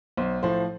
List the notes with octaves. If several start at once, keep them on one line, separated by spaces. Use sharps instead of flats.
B1 C5
A2 F3 A3 C5